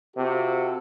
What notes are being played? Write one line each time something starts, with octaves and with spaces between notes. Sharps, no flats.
C3 F4 F#4 A4